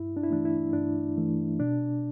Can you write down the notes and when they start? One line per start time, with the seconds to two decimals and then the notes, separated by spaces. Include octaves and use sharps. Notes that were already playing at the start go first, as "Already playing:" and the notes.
Already playing: G2 E4
0.17 D4
0.23 E4
0.30 E3 A3 D4
0.45 E4
0.73 G2 D4
1.17 E3 A3
1.59 B2 D4